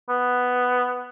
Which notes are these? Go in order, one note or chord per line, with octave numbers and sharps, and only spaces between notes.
B3